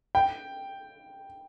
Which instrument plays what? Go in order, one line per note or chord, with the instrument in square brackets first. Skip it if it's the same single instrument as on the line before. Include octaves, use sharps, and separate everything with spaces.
[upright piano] G5